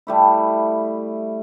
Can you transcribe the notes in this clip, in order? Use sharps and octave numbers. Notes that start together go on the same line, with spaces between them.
G3 A3 E4